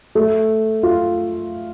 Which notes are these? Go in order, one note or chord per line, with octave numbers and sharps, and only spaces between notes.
A3
F4